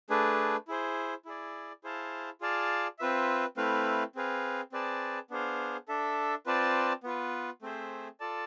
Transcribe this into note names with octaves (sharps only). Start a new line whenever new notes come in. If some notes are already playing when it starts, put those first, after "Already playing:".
A3 D4 G#4 B4
E4 G#4 C5
E4 G#4 D5
E4 G#4 C5 F5 A5
F4 G#4 D5 F5 A5
C4 F4 B4 E5
A3 C4 E4 B4 F5
C4 G#4 B4 F5
C4 G#4 B4 D5 A5
B3 D4 G#4 C5 F5
D4 A4 E5
C4 F4 B4 D5 A5
B3 F4 B4
A3 C4 G#4 C5 E5
F4 A4 D5 A5